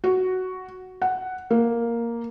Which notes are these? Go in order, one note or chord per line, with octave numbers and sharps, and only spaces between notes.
F#4
F#5
A#3